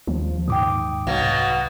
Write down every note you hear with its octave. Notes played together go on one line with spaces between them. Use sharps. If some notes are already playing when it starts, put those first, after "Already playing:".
D#2 F3
G#2 G5 D6 D#6
C2 B2 F#3 F5